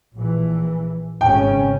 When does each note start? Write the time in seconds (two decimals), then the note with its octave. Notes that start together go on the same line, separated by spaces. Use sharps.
0.15 A#1 E3
1.21 G#1 C#3 C#4 G5